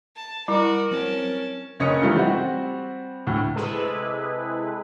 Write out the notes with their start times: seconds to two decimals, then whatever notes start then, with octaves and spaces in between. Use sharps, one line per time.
0.16 A5
0.48 G3 E4 F#4 A#4 A#5
0.91 F#3 C4 C#4 A5
1.80 F#1 C#4 C#5 D#5 D#6 C#7
2.02 E3 F3 G3 A3 D#4 F4
2.16 G3 C4 F#4
3.27 D2 A2
3.56 C3 G#3 E4 G#4 A4 B4